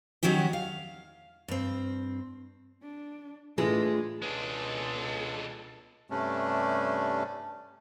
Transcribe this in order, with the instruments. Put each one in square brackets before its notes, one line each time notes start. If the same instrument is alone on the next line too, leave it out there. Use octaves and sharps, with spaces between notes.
[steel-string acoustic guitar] D#3 F#3 C#4 F#4 G4
F5
G2 C4
[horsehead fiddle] D4
[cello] A2 [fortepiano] E3 [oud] G#3 [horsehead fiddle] D4 F4
[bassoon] C#2 [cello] B2 A4 [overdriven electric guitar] G#3 D4
[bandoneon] G2 C3 G3 A3 C#4 D4